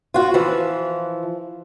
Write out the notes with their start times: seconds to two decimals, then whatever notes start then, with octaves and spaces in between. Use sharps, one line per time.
0.14 F4 F#4
0.34 E3 F3